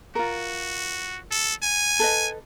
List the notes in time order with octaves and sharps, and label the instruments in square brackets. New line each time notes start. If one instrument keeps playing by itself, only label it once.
[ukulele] F4 A#4 [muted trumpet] F#4
[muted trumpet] A4
G#5
[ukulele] A4 B4 D#5